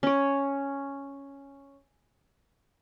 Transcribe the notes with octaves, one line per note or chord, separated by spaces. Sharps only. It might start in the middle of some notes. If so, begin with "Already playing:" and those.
C#4 C#5